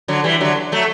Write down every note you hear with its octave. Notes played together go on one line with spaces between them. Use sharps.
D3 F#3
E3 G3
D3 F#3
F#3 A3